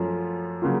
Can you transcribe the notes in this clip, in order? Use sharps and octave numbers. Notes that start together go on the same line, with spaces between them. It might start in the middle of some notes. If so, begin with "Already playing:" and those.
Already playing: F#2 F3 A3 C#4 F4
C#3 F#3 A#3 F4